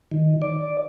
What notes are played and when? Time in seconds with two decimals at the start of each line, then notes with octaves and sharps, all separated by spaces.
0.12 D#3
0.42 D5